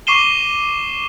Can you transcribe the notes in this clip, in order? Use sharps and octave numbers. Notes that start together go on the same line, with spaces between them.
C#6 D6 C7 D#7 E7 G7